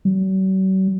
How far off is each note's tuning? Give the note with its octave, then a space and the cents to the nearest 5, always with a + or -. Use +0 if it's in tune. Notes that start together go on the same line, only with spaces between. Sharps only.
F#3 +45